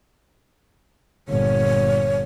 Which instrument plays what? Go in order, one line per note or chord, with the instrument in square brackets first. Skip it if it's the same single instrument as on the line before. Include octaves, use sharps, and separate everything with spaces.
[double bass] G1 A#2 [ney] C#5